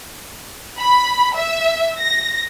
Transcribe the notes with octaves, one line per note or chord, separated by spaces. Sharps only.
B5
E5
A#6